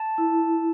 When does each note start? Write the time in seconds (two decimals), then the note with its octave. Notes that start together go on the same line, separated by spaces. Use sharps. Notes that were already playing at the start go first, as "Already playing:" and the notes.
Already playing: A5
0.18 E4